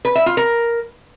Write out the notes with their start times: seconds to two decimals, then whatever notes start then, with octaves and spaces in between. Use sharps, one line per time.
0.05 B4
0.15 E5
0.26 F4
0.37 A#4